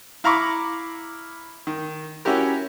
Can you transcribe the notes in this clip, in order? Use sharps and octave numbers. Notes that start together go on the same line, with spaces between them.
E4 F5 A#5 B5 C#6 D6
D#3
C#4 E4 F#4 G4 A#4